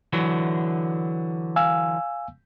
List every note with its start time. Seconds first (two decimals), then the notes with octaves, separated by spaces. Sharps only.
0.13 D3 E3 F#3
1.56 F5 G#5 E6